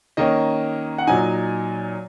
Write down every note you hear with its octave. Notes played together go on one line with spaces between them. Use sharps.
D#3 A#3 C#4 D#5
F#5
A#2 F#3 D#4 G#5